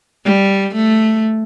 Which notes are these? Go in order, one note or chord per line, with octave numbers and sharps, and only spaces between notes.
G3
A3